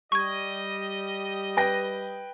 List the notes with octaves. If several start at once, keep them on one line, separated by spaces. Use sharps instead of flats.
G3 G4 D#5 C#6 G#6
B4 G5 A#6